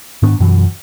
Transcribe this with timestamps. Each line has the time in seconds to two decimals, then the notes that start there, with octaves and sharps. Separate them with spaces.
0.22 G#2 D#3 B3 D4
0.40 F#2 B2 E3 F#3